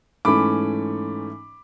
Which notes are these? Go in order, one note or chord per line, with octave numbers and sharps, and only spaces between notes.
G#2 E3 A3 C#4 B5 D6